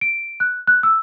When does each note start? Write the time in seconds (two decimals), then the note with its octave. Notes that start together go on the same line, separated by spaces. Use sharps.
0.01 D7
0.40 F#6
0.68 F#6
0.83 E6